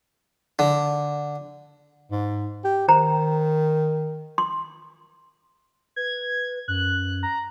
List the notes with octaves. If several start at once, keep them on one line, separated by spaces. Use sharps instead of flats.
D3
G#2
G4
D#3 C5 A#5
C6
B4 G#6
F#2 F#6
A#5